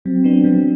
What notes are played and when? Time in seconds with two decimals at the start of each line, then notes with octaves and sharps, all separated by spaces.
0.05 F#3 C4
0.24 B3 D4
0.44 F#3